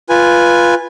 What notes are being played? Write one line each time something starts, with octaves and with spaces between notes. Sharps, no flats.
F4 B4 G#5